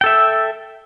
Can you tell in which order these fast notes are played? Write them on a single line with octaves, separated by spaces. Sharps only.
G5 A4 E5